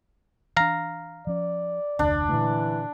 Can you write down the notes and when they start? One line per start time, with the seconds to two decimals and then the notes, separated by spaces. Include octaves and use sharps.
0.57 E3 D4 F5 A#5
1.27 F3 C#4 D5
1.99 F1 D2 D4
2.29 A#2 D3 E3 A3